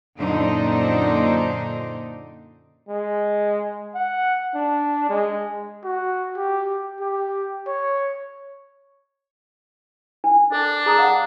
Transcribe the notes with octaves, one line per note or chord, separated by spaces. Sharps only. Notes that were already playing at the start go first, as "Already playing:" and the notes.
F#2 A#2 D3 D#4 C5 D5
G#3
F#5
D4
G#3
F#4
G4
G4
C#5
D4
D4 A4
G#4 A#5 D#6
F5 F#5